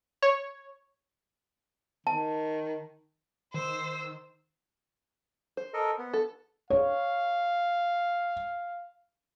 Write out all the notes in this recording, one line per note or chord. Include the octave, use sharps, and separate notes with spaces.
C#5
D#3 A5
D#3 C5 E6
C5
A4 A#4 D#5
B3
A4
C#5 F5